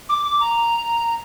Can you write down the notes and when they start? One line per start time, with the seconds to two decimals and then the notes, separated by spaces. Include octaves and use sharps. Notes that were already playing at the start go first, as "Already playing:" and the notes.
0.09 D6
0.25 D6
0.40 A#5